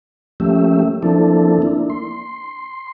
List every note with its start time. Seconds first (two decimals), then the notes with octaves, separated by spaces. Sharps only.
0.40 F3 A3 A#3 C#4 G4 E5
1.03 F3 A#3 C4 D4 E4 A4
1.62 A#3 D4 E4
1.90 C6